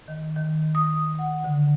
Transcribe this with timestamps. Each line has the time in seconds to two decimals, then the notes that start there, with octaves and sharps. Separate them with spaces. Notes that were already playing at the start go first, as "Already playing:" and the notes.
0.08 D#3
0.36 D#3
0.75 D#6
1.19 F#5
1.44 D3